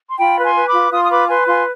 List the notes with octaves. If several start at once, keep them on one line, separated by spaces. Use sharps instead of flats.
C6
F4 G5 B5
B4
G#5 C6
B4
B5 D6
F4
F4 C6 D#6
D#6
B4 B5 D6
B4 G#5 C6
F4 G#5 C6